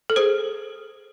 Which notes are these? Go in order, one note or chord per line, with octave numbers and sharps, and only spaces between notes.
A4
G#4 C5